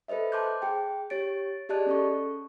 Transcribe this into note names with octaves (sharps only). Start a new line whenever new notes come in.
A4 B4 C5 D#5 E5
A5 C6 D6 F#6 G6
G#4 G5
G4 C#5 A6 D7
G4 G#4 D5 D#5 A5 F#6
C#4 A4 C#6